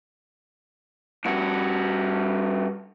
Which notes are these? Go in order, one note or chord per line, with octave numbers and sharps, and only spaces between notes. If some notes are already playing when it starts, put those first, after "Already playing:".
G2 F#4